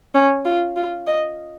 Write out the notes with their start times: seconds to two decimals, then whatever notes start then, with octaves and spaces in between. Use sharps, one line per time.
0.15 C#4
0.45 F4
0.76 F4
1.07 D#5